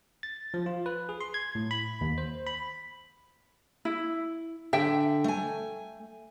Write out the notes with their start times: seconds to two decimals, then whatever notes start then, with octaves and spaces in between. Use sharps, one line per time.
0.23 A6
0.54 F3
0.66 F4
0.86 B4
1.09 G#4
1.21 C6
1.34 G#6
1.55 A2
1.71 B5
2.01 D#2
2.18 C5
2.47 B5
3.85 E4
4.73 D3 E5 G5
5.24 A3 G#5